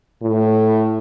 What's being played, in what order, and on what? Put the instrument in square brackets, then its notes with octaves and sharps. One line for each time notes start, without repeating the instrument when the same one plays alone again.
[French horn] A2